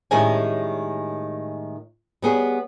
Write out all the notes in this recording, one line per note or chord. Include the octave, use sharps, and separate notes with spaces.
A2 D#3 G3 G#3 C#4 G#5
G3 B3 G#4 C#5